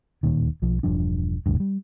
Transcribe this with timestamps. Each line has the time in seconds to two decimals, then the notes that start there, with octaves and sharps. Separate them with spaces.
0.23 D1 D#2 A#2 D#3
0.62 B1 F3
0.83 E1 G2 F3 D4
1.46 E1 A1 D2 G2
1.60 G3